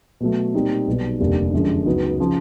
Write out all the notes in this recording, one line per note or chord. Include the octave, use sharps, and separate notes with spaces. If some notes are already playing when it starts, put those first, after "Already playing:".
B2 F#3 A3
A#2 G3 C4 D#4
B1 B2 G3
F1 D#2 D3 G3
F#2 D3 F3 G#3
C#2 C#3 F#3 B3 D#4
C#3 F3